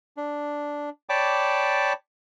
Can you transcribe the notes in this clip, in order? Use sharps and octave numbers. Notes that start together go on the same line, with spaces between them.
D4
C#5 D5 G5 A5 B5 D6